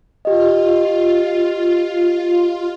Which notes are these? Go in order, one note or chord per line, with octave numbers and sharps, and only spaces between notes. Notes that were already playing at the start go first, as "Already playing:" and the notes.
F4 G4 D#5